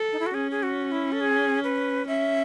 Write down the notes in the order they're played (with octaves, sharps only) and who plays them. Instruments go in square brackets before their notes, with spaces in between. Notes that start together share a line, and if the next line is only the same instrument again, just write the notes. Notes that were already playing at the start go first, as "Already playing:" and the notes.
Already playing: [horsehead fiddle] A4
[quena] D#4
E4
F#4
[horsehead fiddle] C#4 [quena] G#4
[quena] G#4
F#4
E4
A4
G#4
B4
[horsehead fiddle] C#4 [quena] E5